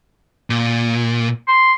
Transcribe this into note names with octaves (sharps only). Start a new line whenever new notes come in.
A#2
C6